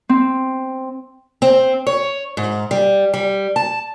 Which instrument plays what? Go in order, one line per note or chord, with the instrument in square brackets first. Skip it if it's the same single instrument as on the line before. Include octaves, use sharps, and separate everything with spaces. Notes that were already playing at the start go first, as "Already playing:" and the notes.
[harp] C4
[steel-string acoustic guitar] C4
C#5
G#2
G3
G3
A5